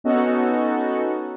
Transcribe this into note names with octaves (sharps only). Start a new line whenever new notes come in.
B3 C#4 D#4 F#4 A4